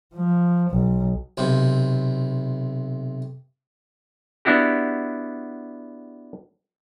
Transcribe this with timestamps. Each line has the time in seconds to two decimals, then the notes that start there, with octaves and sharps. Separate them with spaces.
0.13 F3
0.71 B1
1.37 B1 C3
4.45 B3 D4 E4 F#4 G4